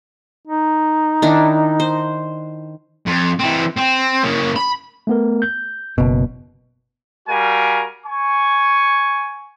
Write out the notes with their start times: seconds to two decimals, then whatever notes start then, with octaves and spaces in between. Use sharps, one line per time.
0.47 D#4
1.22 D#3 D4 E4
1.80 C5
3.06 F2
3.39 E3 C4
3.77 C4
4.23 C#3 A#3
4.56 B5
5.07 A3 B3 A#4
5.42 G6
5.98 F#1 B2
7.28 G3 F#4 A#4 F5 G#5
8.06 G#5 C#6